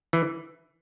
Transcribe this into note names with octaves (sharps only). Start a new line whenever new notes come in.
E3